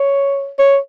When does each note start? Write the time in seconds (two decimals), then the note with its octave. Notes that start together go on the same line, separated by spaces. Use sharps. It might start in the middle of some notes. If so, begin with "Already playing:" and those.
Already playing: C#5
0.59 C#5